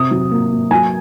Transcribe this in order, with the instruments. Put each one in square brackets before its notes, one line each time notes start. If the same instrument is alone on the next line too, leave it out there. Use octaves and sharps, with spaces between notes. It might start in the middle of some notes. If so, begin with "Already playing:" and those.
Already playing: [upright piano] C3 D#6
F#3
A#3
A#3
F#3 G#5